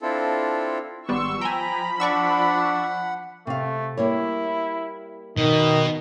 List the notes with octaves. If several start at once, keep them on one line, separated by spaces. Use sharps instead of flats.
C4 D4 E4 F4 A4
G#1 G3 B3 C6 C#6 E6
F3 G5 G#5 A#5 B5
D4 D5 F#5 C#6 E6
C3 A3 F5
G3 A#3 E4 C#5
B2 D#3 D#4